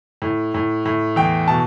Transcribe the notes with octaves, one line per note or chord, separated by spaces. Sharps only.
A2
A2
A2
E2 G5
B2 A5